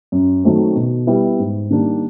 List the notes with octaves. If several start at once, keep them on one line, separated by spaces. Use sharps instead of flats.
F#2
D#3 F#3 A3 C4
B2
G3 B3 E4
G#2
D#3 G3 A#3 D4